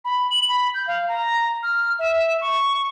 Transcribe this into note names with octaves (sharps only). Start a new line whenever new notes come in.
B5
F#7
B5
G6
F5
A#5
F6
E5
C#6